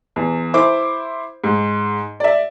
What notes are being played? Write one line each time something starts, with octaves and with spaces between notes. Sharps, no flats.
E2
E4 C5 D6
G#2
D5 E5